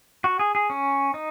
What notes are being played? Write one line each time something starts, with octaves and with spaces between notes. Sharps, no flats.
F#4
G#4
G#4
C#4
D#4